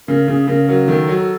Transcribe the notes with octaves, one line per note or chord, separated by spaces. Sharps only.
C#3 A#4
C#3 G#4
C#3 A#4
F#3 A#4
D#3 A4
F#3